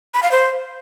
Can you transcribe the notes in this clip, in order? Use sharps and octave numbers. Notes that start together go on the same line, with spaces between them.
B5
F5
C5